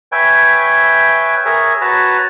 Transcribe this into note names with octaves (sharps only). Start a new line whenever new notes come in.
B4 C#5 E5 G5 G#5
G#4 A#4 C#5 E5
F#4 B4 C#5 A5 A#5